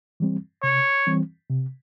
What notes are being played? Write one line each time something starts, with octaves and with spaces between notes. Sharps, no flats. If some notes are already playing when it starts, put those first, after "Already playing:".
E3 G3 C4
C3 C#5
E3 G3 C4
C3